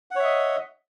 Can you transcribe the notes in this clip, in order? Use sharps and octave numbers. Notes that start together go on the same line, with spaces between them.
C#5 D#5 E5 F#5